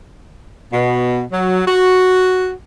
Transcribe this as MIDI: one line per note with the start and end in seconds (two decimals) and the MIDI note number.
0.71 1.21 47
1.31 1.61 54
1.67 2.50 66